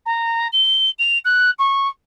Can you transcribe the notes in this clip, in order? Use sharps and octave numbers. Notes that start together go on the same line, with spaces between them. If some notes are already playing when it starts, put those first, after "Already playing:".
A#5
G7
F7
F#6
C#6